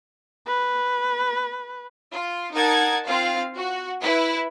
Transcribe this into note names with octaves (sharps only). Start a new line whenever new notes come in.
B4
F4
D#4 A#4 F#5 A5 G#6
C4 F4 F5
F#4
E4 B4